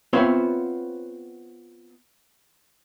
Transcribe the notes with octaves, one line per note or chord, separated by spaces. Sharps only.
B3 C4 F4 C5 C#5 E5